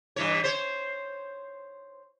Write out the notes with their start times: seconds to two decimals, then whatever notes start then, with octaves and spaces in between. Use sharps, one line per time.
0.16 G2 E3 C#5
0.44 C5 C#5